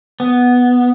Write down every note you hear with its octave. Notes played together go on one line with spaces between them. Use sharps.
B3